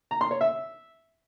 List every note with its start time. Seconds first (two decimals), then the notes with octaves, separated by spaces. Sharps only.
0.11 A#5
0.21 C6
0.31 C#5
0.41 E5